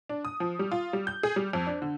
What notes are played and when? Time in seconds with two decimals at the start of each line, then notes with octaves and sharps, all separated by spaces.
0.09 D4
0.25 D#6
0.40 F3
0.59 G3
0.72 F4
0.93 G3
1.07 G6
1.23 G#4
1.36 G3
1.53 F2
1.67 D4
1.82 D3